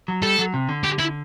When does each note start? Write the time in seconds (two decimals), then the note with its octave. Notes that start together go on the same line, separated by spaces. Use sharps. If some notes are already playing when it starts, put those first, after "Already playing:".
0.08 F#3
0.23 G3 A4
0.39 F#3
0.54 C3
0.69 D3
0.84 G4
0.99 E4